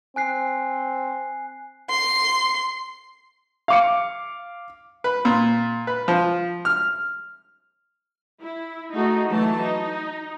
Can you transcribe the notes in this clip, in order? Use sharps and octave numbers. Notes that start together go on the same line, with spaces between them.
C4 G#5 F#6 C7
C6
F5 D6 C#7
B4
A#2
B4
F3
F6
E4
A3 D#4 F#4 G#4
E3 F#3 A3 A5
D#4